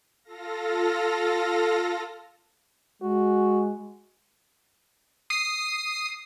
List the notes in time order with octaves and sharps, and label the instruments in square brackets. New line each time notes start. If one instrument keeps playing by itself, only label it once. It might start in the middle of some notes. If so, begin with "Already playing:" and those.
[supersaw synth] F4 A4 F5 A#6
[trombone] G#3 [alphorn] F#4
[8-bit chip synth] D#6 C7